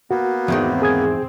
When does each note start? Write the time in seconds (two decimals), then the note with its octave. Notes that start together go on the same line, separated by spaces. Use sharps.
0.11 A#3 B3 F#4
0.48 E2 G#2 D#3 C4
0.82 G#4 D#6 G#6